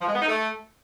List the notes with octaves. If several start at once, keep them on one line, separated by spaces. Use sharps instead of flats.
F3
G#3
B3
D#4
A3